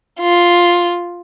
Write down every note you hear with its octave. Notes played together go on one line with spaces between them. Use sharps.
F4